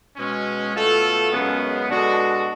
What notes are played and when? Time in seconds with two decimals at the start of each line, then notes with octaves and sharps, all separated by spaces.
0.16 B2 G#3 C#4
0.74 B2 A3 F4 A4
1.31 F#2 C#3 G#3 B3
1.88 B2 G#3 D4 F#4 A4